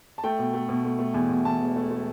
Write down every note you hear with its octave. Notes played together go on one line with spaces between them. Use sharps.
A5
A3 G5
B2
A3
B2
A3
A3
E2
B2
E2 A5
E1
A3
A3